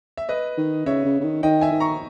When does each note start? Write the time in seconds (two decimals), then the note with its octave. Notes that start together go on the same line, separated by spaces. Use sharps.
0.17 E5
0.29 B4 D#5
0.58 D#3
0.86 C#3 C#5 E5
1.05 C#3
1.20 C#3
1.24 D#3
1.43 D#3 D#5 G5
1.61 E5 G#5
1.72 D#3
1.80 A#5 C#6